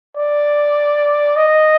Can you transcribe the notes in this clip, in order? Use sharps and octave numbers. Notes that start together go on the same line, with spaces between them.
D5
D#5